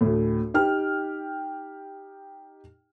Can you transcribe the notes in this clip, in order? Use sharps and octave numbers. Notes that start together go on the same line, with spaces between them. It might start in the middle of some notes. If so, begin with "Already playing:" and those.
D2 A2
D#4 G4 G5 F6